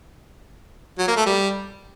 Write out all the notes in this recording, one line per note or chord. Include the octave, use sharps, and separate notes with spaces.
F#3
A#3
A3
G3